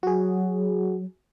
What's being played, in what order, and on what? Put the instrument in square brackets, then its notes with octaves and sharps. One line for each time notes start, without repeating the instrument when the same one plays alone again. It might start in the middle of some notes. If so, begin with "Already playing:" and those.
[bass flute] F#3 [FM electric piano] F#4 G#4